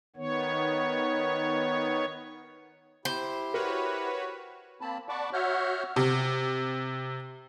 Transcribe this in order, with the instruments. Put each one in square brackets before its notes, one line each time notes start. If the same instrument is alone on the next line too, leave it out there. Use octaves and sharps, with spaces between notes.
[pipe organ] D#3 B3 C#5
[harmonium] E4 G4 [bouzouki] C5
[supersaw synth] F#4 B4 C#5 [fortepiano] A#4
[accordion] A#3 C4 A5 B5
D5 F#5 A5 B5 C#6 D6
F#4 C#5 E5 F#5 F6 G6
[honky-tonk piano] C3